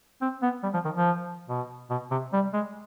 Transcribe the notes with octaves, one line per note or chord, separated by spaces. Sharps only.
C4
B3
G3
F3
D#3
F3
B2
B2
C3
G3
G#3